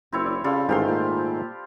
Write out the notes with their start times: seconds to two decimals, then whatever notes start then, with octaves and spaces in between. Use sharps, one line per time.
0.12 F#1 C4 E4 C#5
0.26 D5
0.44 C#3 G3 F4 A4 D5
0.69 A1 G#2 D#3 A3 G4 F5 C6
0.88 A#2 C5